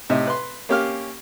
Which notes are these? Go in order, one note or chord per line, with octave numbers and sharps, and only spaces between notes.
A2 C3 D#4 E5
B4 C6
A#3 C#4 G4 F5 F6